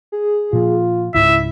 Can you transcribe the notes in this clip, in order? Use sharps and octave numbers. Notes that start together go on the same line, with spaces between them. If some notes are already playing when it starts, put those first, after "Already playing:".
G#4
A#2 F3 F4
C#2 G#2 C#3 E4 E5